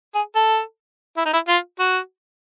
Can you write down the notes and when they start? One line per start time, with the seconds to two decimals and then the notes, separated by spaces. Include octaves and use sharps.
0.15 G#4
0.36 A4
1.17 E4
1.25 D#4
1.33 E4
1.48 F4
1.79 F#4